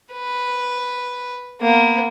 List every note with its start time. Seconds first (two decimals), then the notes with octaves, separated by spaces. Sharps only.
0.13 B4
1.61 A#3 B3